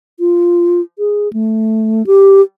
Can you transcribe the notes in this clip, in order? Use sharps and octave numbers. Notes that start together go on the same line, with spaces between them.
F4
G#4
A3
G4